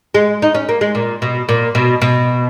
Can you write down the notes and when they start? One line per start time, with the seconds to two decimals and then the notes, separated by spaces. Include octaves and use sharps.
0.14 G#3
0.42 D#4
0.54 C#4
0.69 A#3
0.81 G#3
0.95 A#2
1.22 B2
1.49 A#2
1.75 B2
2.02 B2